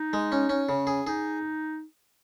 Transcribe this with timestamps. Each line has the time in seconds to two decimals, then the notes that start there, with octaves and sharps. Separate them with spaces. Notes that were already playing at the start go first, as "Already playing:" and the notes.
Already playing: D#4
0.13 G#3
0.32 C#4
0.49 C#4
0.69 C#3
0.87 G#4
1.06 D#4 G#4